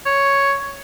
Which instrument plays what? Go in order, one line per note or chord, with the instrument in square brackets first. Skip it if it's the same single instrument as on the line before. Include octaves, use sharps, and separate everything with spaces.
[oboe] C#5